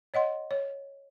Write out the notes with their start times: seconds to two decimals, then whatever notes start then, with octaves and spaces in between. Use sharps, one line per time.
0.14 C#5 D#5 F#5 C6
0.51 C#5